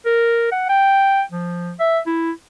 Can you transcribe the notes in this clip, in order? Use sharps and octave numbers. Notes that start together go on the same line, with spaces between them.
A#4
F#5
G5
F3
E5
E4